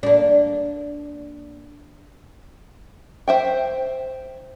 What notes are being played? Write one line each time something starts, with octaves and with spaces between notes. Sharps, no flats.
A#3 D4
C5 E5 G5